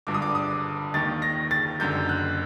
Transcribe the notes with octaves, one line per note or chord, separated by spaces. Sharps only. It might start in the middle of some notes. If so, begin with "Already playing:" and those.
G1 G2 D3 D6
D#6
D6
D#6
D#2 D#3 A6
A#6
A6
F#1 F#2 D3 G6
F#6